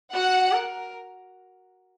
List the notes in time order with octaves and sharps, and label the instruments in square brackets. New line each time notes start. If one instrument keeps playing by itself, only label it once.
[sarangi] F#4 [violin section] F#5
[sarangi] A#4